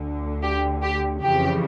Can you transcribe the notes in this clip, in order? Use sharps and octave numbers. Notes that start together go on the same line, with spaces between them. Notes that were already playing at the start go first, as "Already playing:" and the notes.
Already playing: D2 D3
G4
G4
F2 C#3 E3 G4